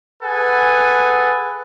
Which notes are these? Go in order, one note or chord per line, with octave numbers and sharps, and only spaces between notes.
G#4 A4 B4 F#5 G#5